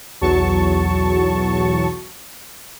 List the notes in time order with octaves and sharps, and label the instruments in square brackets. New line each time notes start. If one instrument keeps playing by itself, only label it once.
[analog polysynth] B1 E2 F#3 A5 C#6